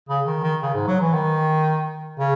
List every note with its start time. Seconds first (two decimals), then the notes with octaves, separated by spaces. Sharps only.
0.09 C#3
0.27 D#3
0.43 D#3
0.62 C#3
0.74 G#2
0.87 F#3
1.01 E3
1.13 D#3
2.19 C#3